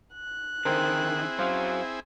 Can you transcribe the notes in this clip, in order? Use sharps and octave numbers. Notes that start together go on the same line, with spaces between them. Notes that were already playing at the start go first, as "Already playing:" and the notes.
F#6
D3 D#3 C4 E4 G#4 A#4 C5 G5
F#2 F#3 C5 F5